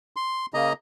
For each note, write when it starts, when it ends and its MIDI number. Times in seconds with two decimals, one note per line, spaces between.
0.16 0.46 84
0.54 0.73 49
0.54 0.73 58
0.54 0.73 75
0.54 0.73 82